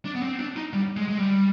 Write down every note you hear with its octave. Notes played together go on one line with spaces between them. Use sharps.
D4
B3
C4
D4
D#4
G3
G#3
G#3
G3